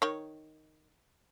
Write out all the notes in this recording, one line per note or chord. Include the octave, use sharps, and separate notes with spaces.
D#3 C#5